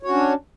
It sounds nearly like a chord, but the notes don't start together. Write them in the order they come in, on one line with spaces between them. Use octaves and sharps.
C#5 F#4 C#4 D4